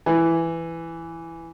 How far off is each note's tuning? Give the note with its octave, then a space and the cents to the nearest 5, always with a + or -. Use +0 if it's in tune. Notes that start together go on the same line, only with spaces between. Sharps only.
E3 +10